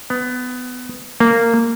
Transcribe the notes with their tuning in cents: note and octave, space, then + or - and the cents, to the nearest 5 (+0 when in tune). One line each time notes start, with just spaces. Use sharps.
B3 +20
A#3 -15